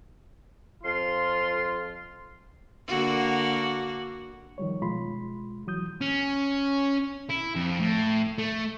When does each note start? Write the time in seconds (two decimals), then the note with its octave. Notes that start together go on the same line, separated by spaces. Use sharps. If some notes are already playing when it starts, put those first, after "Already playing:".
0.84 F2 F4 C6
2.87 D3 A#3 F#4
4.58 D#3 F3 G3 C#5
4.82 B2 G#3 F4 B5 C6
5.67 E3 F#3 D#6 G6
6.01 C#4
7.29 E4
7.55 F2
7.79 A2
8.39 A3